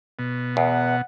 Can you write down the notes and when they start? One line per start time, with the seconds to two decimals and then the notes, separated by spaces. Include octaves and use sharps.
0.19 B2
0.57 E2 F#5